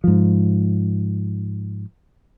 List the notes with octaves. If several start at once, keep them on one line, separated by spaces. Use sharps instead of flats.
G#2 F3